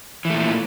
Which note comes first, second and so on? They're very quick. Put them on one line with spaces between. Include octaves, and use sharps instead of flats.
E3 A3 A#2